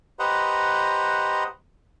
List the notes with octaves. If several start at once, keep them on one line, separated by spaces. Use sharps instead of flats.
G4 B4 C5 D#5 F#5 A#5